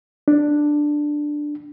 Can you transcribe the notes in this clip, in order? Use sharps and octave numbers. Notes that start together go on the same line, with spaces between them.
D4